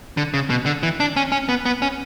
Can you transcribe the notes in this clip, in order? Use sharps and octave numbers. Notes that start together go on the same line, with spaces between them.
D3
C#3
B2
D3
E3
D4
C#4
C#4
B3
B3
C#4